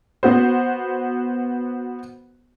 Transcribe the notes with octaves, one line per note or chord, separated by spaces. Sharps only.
B3 F#4 C5